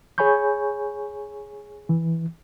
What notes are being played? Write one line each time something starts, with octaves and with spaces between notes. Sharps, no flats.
G#4 C#5 G#5 B5 C#6 G6
E3